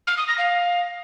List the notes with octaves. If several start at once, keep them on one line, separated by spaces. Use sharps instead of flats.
F6
D#6
A#6
F5